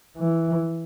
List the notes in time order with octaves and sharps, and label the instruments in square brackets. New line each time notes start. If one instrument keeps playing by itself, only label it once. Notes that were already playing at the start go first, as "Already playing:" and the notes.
[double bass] E3